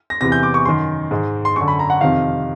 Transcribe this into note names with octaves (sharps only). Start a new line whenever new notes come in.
A#6
E2 C3 E3 A#6
G6
D6
C#6
F#2 D#3 C6
G#2 D#3
C6
F#2 D3 C#6
B5
A#5
F#5
F2 C3 D#3 F5